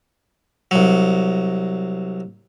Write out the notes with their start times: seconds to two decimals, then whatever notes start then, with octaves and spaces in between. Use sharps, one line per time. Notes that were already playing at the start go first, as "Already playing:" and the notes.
0.71 C2 F#3